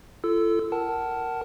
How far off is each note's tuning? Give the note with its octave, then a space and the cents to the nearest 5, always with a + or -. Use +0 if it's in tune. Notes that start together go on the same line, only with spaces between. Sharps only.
F4 -40 A4 +0 E6 +0
A#4 +0 F#5 +30 A5 +0